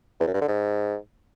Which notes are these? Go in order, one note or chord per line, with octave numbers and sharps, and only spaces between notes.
E2
F#2
G2
D3
G#2